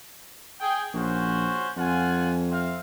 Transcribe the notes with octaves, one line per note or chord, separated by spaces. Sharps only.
G#4 G5
A#1 C#4 F#4 C5
F2 F4 F#5 G#5
C4 E5 F5